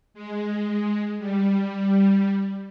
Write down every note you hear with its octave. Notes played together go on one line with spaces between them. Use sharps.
G#3
G3